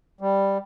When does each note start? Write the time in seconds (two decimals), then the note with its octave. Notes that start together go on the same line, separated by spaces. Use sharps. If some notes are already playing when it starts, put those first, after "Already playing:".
0.21 G3